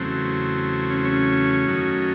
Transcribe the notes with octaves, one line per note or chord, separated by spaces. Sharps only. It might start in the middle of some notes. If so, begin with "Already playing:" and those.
Already playing: E2 C#3 F#3 A3 C4
C#4
C4
C#4
F#2 D#3 F#3 A3